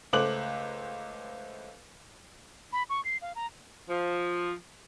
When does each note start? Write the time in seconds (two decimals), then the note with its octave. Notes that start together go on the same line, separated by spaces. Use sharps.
0.13 C#2 A3 C5 D6 F#6 F#7
2.73 B5
2.90 C#6
3.05 C7
3.22 F5
3.36 A#5
3.89 F3